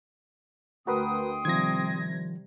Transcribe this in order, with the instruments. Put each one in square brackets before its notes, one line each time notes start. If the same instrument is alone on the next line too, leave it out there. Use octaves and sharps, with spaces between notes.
[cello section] D2 [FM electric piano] F#4 A#4 B4 [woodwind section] G5 C6 D#6
[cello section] C3 G3 [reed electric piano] D#3 F3 [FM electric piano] G#6 A#6